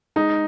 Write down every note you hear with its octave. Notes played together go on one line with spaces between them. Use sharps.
G#3 D#4